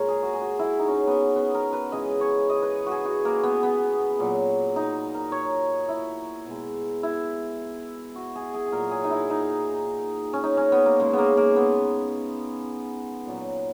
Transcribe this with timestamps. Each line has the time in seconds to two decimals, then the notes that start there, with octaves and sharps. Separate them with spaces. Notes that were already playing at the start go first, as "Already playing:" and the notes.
Already playing: A#2 G#3 A#4 C#5
0.09 G#4
0.23 F#4
0.34 G#4
0.41 F#4
0.59 E4
0.79 D#4
0.88 C#4
0.94 D#4
1.08 B3
1.36 B3
1.54 A#4
1.73 B4
1.92 C#3 E3 G#3 D#5
2.21 C#5
2.50 D#5
2.63 B4
2.87 F#4
2.92 G#4
3.05 F#4
3.25 A#3
3.43 B3
3.63 B3
4.19 A#2 F#3
4.76 D#4
5.14 A#4
5.32 C#5
5.89 E4
6.46 B2 G#3
7.03 E4
8.16 F#4
8.36 G#4
8.54 G#4
8.66 G#4
8.72 A#2 A#4
8.77 F#3
8.91 G#4
9.04 D#4
9.11 E4
9.30 D#4
10.33 C#4
10.43 D#4
10.57 C#4
10.72 B3
10.86 A#3
11.00 C#3 G#3 A#3
11.13 A#3 B3
11.37 A#3
11.56 B3
13.26 A#2 F#3